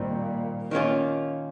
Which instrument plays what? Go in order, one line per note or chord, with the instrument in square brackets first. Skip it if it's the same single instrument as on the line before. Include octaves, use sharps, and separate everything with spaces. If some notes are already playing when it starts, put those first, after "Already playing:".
Already playing: [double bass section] A#2 [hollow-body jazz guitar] D#3 G3 C4 F4
[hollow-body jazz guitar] D#3 A#3 C#4 F4